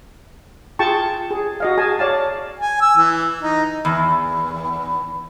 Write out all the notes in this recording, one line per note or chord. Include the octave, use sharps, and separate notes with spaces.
F4 G#4 G5 A5 C#6
G#4
F#4 D#5 F5
G#4 G#5 A5
C#5 D5 F5 A5
G#5
E6
E3
D#4
E2